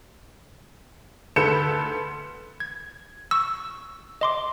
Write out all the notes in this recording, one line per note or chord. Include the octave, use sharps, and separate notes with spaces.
D2 A4 B4 G6 C#7 E7
G#6
C#6 E6
D#5 C6 D6